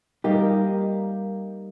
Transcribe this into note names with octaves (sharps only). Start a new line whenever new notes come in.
G3 A#3 D#4 G4